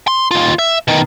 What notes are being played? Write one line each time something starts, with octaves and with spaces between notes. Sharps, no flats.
C6
D#2 F4
E5
B2 D#3